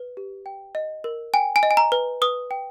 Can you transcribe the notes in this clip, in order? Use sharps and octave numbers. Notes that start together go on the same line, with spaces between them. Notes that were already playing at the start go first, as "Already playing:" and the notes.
Already playing: B4
G4
G5
D#5
A#4
G5 G#5
G#5
D#5
G#5
A#5
B4
B4 D#6
G5